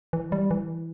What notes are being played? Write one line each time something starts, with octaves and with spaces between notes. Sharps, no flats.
E3
G3
E3